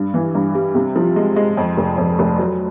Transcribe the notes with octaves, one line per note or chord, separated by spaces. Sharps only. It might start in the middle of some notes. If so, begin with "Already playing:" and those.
Already playing: G2
E3
G2
G3
C3
F3
G#3
G#3
F2
F1
F2
F1
F#3